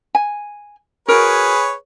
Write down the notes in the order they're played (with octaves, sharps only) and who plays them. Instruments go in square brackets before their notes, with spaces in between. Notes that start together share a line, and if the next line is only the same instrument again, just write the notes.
[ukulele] G#5
[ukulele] F#4 A#4 [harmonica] G#4 B4 C#5